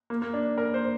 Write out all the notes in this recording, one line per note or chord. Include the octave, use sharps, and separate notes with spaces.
A#3
A#3
D4
A#4
C5